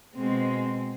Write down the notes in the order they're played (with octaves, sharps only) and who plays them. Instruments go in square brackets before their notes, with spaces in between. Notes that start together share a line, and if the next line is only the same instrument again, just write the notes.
[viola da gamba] B2 G#3 C4